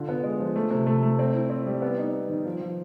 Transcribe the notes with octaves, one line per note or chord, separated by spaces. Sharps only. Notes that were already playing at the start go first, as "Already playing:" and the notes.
Already playing: D3 F4
B3
G#3
F3
A3
C3
A3
A3
C4
E4
C4
G3
B3
D#4
B3
D#3
F3
F3